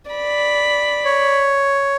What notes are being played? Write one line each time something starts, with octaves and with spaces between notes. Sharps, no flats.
D5 B5
C#5